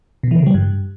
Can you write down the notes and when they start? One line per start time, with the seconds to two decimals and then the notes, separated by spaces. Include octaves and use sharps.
0.23 B2
0.31 E3
0.39 C#3
0.46 G3
0.54 G2